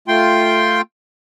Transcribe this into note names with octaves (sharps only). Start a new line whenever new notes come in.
A3 F4 G5 C6